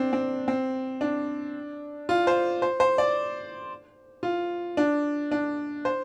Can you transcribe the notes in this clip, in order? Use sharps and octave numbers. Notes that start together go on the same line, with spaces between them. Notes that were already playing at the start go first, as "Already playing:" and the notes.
Already playing: C4 D4
C4
C4
D4
F4
C5
C5
C5
D5
F4
D4
D4
C5